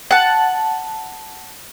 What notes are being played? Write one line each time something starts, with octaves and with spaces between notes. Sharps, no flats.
F#5 A5